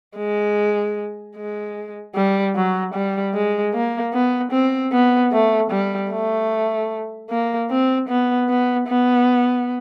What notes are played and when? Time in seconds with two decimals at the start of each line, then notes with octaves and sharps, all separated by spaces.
0.17 G#3
1.36 G#3
2.16 G3
2.55 F#3
2.94 G3
3.34 G#3
3.74 A#3
4.13 B3
4.52 C4
4.92 B3
5.32 A3
5.71 G3
6.11 A3
7.30 A#3
7.70 C4
8.08 B3
8.49 B3
8.88 B3